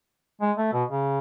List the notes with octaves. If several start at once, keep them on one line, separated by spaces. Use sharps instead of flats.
G#3
A3
B2
C#3